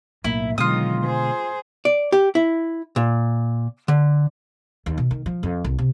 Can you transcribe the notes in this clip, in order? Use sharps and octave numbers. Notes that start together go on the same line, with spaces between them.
B1 A2 A#3 E4
B2 D3 D#3 F#3 G#3 F4 D#6
G#4 C5
D5
G4
E4
A#2
D3
D#2
B2
D#3
F3
F2
C2
C3